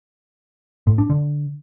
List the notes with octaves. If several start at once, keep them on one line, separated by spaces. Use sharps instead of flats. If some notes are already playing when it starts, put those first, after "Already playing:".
A2
D4
D3